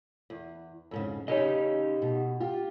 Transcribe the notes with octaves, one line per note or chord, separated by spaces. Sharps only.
E2
F2 G#2 C#3
C#3 C#4 D#4 G4 D#5
B2
F4 G4